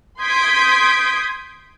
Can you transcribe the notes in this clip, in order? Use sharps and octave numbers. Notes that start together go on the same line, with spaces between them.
C6 D#6 G6 G#6 B6 D7